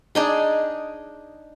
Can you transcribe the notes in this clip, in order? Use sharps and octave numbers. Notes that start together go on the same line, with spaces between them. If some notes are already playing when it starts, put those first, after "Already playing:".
D4 D#4 G#4